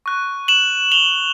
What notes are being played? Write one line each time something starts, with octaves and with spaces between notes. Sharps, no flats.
C#6 F#6
E7 F#7
F7 G7